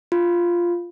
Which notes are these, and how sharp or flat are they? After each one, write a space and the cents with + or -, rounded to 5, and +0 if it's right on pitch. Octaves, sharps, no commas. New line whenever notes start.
F4 -5